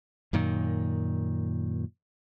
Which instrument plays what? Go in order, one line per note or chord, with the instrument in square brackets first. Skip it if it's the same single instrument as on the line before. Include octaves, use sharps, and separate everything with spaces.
[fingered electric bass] F#2 A#2 D#3